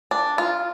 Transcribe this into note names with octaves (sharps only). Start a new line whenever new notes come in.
D4
F4